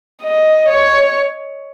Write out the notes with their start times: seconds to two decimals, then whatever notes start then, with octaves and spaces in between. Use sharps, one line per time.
0.24 D#5
0.69 C#5